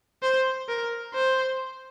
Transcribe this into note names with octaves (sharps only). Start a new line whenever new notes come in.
C5
A#4
C5